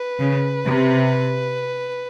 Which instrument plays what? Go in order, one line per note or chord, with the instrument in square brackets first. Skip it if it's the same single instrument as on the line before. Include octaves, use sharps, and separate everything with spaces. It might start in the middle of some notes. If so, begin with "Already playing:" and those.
Already playing: [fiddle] B4
[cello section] C#3
C3